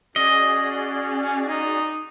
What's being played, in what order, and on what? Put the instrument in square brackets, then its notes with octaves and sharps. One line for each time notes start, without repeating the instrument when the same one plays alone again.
[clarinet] C#4 [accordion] F#4 G#4 D5 [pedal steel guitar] D#5
[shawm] D#4